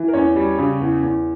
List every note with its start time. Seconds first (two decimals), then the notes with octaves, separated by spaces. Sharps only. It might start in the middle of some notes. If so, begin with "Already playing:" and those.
Already playing: E3
0.08 A#4
0.13 E2 C#4 C#5
0.36 G3
0.58 C#3
0.80 E2
1.03 E2